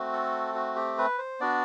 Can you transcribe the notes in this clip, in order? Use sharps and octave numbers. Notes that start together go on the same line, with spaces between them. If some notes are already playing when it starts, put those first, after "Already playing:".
Already playing: A3 C4 F#4
A4
F#4
G4
B4
C5
B3 D4 F#4 D5